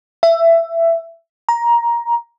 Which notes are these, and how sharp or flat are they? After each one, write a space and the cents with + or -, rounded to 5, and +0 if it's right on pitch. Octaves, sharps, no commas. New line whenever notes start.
E5 +15
A#5 +15